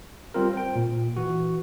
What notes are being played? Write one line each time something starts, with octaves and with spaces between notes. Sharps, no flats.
G3 C4 F4 A#4
C5 G5
A#2
E3 F#4